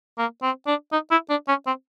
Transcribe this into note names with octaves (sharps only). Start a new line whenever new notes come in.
A#3
C4
D4
D#4
E4
D4
C#4
C4